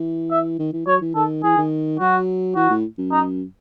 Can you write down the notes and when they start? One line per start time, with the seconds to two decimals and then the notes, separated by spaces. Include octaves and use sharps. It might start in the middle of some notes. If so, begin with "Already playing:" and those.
Already playing: E3
0.31 E5
0.59 D#3
0.73 E3
0.86 F#3 C#5
1.01 E3
1.15 D#3 A4
1.43 E3 G#4
1.58 D#3
1.99 F#3 F#4
2.55 E3 F#4
2.70 A2
2.98 F#2
3.12 D#4